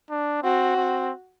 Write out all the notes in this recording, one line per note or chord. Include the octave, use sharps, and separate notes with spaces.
D4
C4 F#4
C4